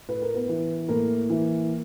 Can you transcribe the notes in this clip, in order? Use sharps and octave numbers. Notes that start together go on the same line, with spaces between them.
A2 B4
A#4
B3 B4
E3
A2 A#3 A#4
E3